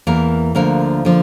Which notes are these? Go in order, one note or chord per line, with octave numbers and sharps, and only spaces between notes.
E2 E3 A#3 A#4
D2 D3 F3 A#3 A#4
D3 F3